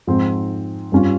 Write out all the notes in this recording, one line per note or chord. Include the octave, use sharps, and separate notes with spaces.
G#2 F3 C4
G2 G3 C#4 F4